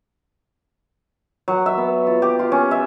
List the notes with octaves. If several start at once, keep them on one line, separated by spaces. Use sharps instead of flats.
F#3
E5
B3
F4
G4
F4
C#4
E5